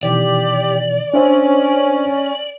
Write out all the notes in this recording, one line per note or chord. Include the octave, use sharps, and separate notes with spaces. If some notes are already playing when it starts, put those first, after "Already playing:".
B2 D#3 E3 G4 D5
C#4 D4 C5 E5